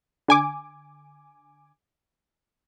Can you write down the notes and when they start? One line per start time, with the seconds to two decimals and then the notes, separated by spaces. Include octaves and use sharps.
0.28 D3 G#5 D6